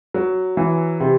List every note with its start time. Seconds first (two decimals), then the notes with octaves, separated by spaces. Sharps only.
0.14 F#3
0.57 E3
1.00 C3